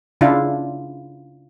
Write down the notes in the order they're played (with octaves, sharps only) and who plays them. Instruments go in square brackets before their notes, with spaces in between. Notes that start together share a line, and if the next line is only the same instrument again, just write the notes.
[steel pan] C#3 D4 E4 F4